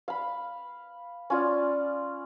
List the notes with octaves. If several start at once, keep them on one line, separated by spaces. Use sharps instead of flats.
F5 B5
C#4 F4 D5